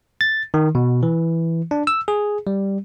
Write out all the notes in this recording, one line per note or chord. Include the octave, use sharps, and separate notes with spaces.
A6
D#3
B2
E3
D4
E6
G#4
G3